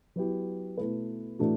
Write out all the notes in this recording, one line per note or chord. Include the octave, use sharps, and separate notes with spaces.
F#3 B3 E4 G4
B2 A3 E4 B4
A2 E3 A3 D4 F#4